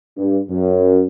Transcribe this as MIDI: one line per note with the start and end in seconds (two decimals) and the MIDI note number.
0.18 0.38 43
0.49 1.04 42